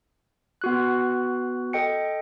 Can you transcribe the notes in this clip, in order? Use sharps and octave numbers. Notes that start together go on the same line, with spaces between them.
B3 F#4 F#6
A4 D#5 G5 C#7